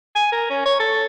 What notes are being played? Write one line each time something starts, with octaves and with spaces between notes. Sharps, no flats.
G#5
A#4
C#4
C#5
A4